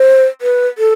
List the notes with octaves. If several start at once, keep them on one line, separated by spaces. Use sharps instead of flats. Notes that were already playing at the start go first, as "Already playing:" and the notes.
Already playing: C5
B4
A4